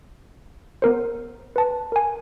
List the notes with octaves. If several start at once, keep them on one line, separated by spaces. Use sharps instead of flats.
B3 A#4 C5
B4 A5
A#4 G#5